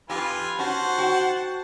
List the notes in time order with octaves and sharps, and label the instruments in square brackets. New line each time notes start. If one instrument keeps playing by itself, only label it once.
[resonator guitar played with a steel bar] F2 G4 [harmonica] F4 B4 G#5
[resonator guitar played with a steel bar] C#4 F#4 [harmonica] C5 F#5 A5
[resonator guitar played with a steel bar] F#4 G5